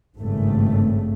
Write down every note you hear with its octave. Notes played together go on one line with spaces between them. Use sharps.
G#1 G2 C#3 A3